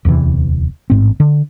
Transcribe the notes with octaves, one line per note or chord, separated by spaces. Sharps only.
D1 E2 C3 E3
A1 G#2 C4
D3